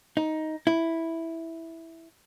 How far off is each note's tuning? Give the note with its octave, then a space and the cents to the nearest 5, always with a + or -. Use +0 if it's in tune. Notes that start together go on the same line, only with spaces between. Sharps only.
D#4 +10
E4 -5